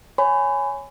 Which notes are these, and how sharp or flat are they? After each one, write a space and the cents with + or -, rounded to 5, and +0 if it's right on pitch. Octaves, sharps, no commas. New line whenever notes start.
C#5 +0 G#5 +0 B5 +30